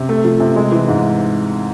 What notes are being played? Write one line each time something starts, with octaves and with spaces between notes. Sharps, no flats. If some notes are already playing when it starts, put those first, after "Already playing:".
Already playing: C3
A3
F3
C3
G#3
E3
G#2